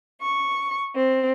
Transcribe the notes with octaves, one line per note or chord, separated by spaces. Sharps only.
C#6
C4